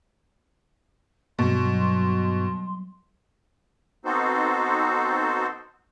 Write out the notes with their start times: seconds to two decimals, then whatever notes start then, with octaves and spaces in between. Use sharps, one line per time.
1.39 G2 B2 F#3 G3 B3 C6
4.05 B3 C4 D#4 F#4 A4 C5